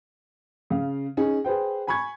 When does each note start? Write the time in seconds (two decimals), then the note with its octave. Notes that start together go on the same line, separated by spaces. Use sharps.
0.70 C#3 F5
1.17 C#4 D#4 G#4
1.44 G#4 B4 C5 G5
1.87 G#5 B5 C#6 G#6